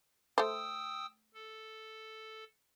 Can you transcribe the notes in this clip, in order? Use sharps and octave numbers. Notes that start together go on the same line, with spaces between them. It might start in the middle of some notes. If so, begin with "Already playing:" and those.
A3 C5 G5 D#6 E6
A4